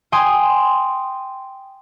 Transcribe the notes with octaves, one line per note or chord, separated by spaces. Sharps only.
G5 G#5 C6 D#6